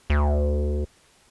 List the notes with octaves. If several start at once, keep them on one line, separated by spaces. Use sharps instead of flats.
D2